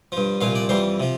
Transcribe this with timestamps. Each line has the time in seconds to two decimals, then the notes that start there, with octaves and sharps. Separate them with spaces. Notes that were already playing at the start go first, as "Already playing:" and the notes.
0.12 G2 F3
0.41 C2 A#2 F3 F5
0.55 D5
0.69 F2 E3 G3 C5
1.00 C3 F3